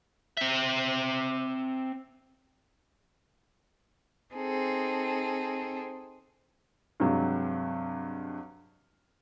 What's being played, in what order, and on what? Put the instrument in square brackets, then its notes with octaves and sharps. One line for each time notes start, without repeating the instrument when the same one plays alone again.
[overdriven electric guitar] C4 E5
[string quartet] C4 D#4 G#4 A4
[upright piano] G2 C3 F#3 G#3